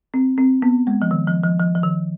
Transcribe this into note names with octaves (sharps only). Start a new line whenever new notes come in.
C4
C4
B3
G#3
F3
D#3
F3
F3
F3
F3
D#3